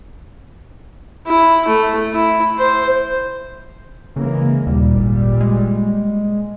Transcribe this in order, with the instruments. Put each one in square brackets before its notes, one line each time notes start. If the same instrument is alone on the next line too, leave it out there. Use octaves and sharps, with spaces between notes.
[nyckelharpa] E4
A3
E4
C5
[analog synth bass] C#3 [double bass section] E3 G#3 A#3
[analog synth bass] D#2 [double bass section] A#2 G3
[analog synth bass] G#1
G#3